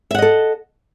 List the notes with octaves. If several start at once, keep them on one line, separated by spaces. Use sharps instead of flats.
A4 D#5 E5 F#5